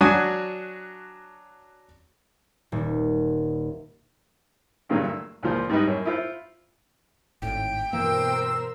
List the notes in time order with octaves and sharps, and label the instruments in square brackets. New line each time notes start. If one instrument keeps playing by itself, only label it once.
[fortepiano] F#3 D4 F#4 G#5 D#6
[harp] D#1
[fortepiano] G2 A#2 D3 F#3 A3 A#3
E6
C#2 A#2 F3 C5
G#2 G3 D#4 B4 D#5
F#2 C#5
E4 F4 C5
[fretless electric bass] G#1 A2 [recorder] G5
[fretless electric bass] G2 E3 A#3 [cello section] B2 A#4 C5 [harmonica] E6